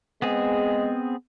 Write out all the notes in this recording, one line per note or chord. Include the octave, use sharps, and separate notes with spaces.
G#3 B3 C4 G#4